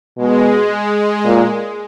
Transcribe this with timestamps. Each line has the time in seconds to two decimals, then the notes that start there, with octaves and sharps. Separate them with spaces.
0.18 B2 G#3
1.25 A#2